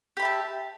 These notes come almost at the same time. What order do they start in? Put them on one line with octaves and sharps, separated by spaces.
G4 B5 E5 A5